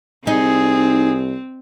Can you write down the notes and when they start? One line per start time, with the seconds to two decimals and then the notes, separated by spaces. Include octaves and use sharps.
0.27 C2 C4 D#4 G#4